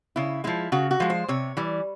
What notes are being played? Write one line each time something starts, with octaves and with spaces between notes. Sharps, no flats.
C#3 E4
F3 G#3 E4
C#3 F#4
F#4
F3 G#3
C5
C3 C#5
E3 G3